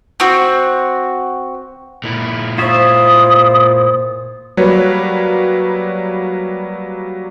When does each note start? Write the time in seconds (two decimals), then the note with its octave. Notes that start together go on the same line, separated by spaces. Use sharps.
0.20 C4 F#4
2.04 A#2 E4
2.58 F4 C5 C#5 E5 D#6
4.57 F#3 G3 A#3 B4 C#5